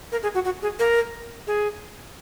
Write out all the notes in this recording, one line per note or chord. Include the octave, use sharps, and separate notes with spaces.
A#4
G#4
F#4
F#4
G#4
A#4
G#4